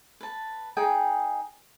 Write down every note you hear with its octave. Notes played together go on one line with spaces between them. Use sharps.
B4 A5
D#4 G#4 G5